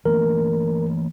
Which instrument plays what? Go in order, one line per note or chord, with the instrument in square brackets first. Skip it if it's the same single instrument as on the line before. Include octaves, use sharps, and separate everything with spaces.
[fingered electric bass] E3 A3 A#3 [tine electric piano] A#4